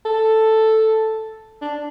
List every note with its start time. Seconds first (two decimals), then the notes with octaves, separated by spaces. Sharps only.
0.05 A4
1.61 D4